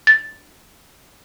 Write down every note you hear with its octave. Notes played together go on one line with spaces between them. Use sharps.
A6